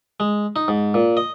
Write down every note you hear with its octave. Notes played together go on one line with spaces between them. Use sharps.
G#3
D#4
G#2
A#2
D#5